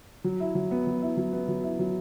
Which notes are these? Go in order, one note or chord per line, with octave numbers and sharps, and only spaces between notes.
F#3
E4
F#3
B3
F#3
E4
F#3
B3
F#3
E4
F#3